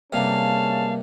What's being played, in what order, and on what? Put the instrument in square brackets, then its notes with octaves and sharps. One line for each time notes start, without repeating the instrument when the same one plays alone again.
[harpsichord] G2 C3 [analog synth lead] A#3 [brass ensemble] C#4 G#4 A5 [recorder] F5